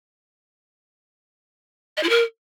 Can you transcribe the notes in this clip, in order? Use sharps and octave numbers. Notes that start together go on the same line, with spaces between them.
D#5
E4
A#4